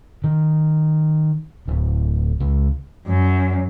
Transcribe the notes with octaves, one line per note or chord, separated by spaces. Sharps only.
D#3
D1
C#2
F#2